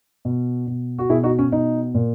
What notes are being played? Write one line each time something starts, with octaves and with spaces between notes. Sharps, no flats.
B2
B2
F#4
B2 E4 G#4
D#4 F#4
C#4
B2 D#4
A#2